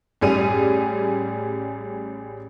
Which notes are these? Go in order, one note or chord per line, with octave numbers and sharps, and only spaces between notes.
A1 G3 G#4 D#7 F7